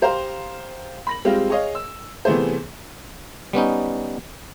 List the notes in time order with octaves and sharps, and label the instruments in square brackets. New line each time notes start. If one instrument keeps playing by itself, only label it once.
[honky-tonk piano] G4 C5 F5 A#5 C6
B5 A#6 F#7
G3 G#3 C4 F4 G4 F5
G#4 C#5 D#5 F5
E6
C3 E3 A3 B3 G#4 C5
[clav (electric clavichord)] G3 B3 C#4 D#4